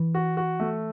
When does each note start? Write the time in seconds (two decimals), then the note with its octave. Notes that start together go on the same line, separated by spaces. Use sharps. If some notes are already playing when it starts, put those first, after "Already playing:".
Already playing: E3
0.15 F#4
0.37 F#4
0.60 A3